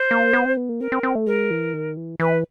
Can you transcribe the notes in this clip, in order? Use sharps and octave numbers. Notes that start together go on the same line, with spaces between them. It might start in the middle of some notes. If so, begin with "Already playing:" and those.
Already playing: C5
A#3
B3
C4
B3
A#3
C4 A#4
C4
C4
A3
G#3 A#4
E3
D#3
E3
E3 B4